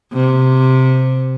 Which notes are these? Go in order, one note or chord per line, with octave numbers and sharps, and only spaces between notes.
C3